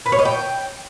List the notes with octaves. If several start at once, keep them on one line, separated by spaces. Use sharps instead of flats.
B4
C#5
D#5
G5